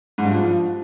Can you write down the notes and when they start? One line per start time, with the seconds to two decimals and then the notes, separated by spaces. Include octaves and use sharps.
0.18 G#2
0.25 G2
0.32 F3